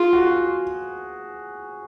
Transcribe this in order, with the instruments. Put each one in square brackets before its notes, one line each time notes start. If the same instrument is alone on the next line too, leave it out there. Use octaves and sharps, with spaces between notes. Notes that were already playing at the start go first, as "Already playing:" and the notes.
Already playing: [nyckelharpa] F4 [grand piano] G#4
[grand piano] F#4